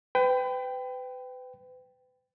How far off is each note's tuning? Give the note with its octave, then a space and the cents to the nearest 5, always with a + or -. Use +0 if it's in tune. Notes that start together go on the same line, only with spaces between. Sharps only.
B4 +35 G5 +0